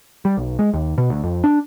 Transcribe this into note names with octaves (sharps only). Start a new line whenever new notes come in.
G3
B1
G#3
D#2
B2
D2
F2
D4